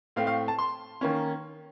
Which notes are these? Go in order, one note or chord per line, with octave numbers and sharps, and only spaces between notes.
A2 A3 C4 F5
F5
A5
C6
D#3 A#3 C#4